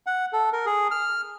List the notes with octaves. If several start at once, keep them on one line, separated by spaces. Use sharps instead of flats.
F#5
A4
A#4
G#4
F6